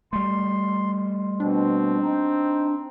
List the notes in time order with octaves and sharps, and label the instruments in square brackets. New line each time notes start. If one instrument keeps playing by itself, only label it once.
[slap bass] G3 A3 [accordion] C6
[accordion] B2 [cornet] C4 [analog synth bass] D4
[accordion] D#4